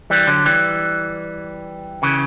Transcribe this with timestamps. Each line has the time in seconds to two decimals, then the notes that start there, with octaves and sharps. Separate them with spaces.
0.10 E3 G3
0.27 D3 F#3
0.46 E3 G3
2.03 C#3 E3